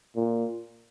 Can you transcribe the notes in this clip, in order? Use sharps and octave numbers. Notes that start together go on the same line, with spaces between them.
A#2